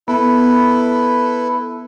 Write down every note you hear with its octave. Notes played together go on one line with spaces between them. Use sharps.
B3 E4 A4 B4